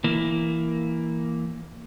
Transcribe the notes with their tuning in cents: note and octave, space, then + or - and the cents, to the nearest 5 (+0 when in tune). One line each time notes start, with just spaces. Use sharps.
E3 +0 A#3 +0